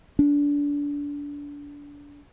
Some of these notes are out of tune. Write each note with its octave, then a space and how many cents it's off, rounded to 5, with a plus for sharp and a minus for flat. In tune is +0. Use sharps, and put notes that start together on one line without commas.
D4 -25